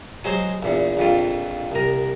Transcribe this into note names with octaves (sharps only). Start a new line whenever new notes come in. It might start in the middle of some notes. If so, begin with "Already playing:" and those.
F#3 G#3 C5
A#1 E2
A#1 F2 F4
C2 A#4